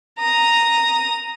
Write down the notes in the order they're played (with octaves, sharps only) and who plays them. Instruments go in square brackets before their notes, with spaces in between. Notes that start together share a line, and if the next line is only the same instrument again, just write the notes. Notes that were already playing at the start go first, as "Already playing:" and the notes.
[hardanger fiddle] A#5 D#6